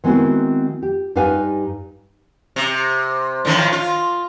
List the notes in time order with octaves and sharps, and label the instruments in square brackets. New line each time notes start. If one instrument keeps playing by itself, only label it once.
[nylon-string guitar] D#3 G#3 B3 C4 E4 F#4
G4
G2 G3 D#4 B4 F5 G#5
[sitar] C3
A2 D#3 F3
F4